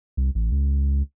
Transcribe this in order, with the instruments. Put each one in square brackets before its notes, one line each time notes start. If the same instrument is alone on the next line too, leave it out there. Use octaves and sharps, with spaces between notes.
[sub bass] C2
A1
C#2